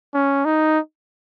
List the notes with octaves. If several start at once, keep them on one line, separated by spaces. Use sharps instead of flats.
C#4
D#4